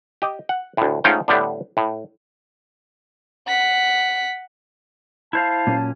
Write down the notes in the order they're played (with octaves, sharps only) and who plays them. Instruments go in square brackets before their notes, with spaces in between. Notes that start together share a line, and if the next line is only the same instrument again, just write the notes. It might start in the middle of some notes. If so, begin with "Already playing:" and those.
[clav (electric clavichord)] G4 D#5
F#5
D2 A2
G#2 A3 C#4 D#4 F4 G5
A2 D3 G3 B3 D4
A2
[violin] F#5 B6
[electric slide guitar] E4 C5 F5 [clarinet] A5
[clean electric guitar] A#2 F#3 C#4